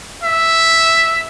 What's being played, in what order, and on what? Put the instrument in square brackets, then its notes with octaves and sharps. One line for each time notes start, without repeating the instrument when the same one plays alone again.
[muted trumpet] E5